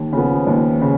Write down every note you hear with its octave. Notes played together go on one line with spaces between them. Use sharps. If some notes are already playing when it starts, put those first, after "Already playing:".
Already playing: D#2
C#3 F3 B3
D#2
C#3